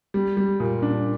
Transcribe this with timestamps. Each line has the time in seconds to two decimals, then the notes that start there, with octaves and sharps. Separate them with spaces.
0.14 G3
0.37 G3
0.60 A#2
0.82 D4